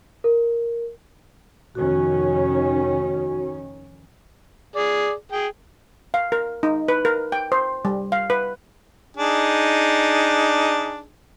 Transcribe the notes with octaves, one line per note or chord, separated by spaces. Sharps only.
A#4
F1 D#3 C#4 F#4
G#4 D5
G#4 G5
F5
A#4
D#4
B4
A#4
G5
C5
G3
F5
B4
D4 D#4 G#4